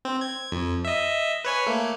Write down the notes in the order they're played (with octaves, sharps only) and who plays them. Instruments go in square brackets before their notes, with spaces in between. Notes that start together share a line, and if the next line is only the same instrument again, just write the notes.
[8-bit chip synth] C4
G#6
F2
D#5 E5
B4 C#5 G#5
A3 A#3